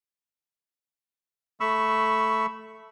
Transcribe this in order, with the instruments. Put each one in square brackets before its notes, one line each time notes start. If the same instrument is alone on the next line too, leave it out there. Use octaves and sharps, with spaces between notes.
[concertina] A3 B5 C#6 E6